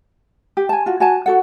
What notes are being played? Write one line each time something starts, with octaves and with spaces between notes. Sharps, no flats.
G4
G#5 A5
F4 F#4
F#4 G#5 A5
F#4 A4 F#5